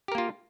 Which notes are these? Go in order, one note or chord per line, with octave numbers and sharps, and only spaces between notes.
A#3 F4 G4 A#4